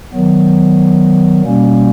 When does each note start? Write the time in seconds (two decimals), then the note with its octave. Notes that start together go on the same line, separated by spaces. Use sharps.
0.12 D#3 F#3 B3
1.43 B2 G3 A#3 C#4